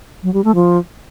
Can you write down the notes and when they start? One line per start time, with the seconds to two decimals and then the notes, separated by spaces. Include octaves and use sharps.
0.23 F#3
0.34 G3
0.44 A3
0.55 F3